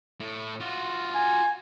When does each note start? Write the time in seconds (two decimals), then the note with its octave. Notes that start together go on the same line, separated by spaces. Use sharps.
0.20 A2
0.60 F4 F#4
1.15 G#5